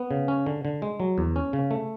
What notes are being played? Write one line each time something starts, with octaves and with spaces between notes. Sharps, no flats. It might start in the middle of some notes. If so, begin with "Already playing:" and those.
Already playing: B3
C#3
C#4
D3
D3
G#3
F#3
E2
C#4
C#3
A3